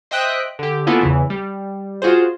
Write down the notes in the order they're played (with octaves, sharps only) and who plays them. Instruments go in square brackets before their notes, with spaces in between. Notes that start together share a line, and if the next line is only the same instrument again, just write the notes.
[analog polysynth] C5 D#5 E5 G5 D#6 F#6
D3 G4
A#3 B3 C#4 E4 F4 A4
E2 C#3 E3
G3
F4 F#4 G#4 C5